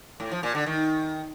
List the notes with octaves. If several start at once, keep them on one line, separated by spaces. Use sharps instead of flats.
A2
F3
A#2
D3
D#3